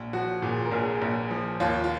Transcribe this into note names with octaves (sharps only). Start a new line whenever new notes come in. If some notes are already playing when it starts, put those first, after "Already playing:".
Already playing: A#1
F3 F#4
A#2 G#4
A#4
A#1 G#4
A#1
F3
D#2 F4
F4